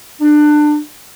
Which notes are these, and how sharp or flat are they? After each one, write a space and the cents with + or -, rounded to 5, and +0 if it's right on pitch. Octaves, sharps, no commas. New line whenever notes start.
D4 +25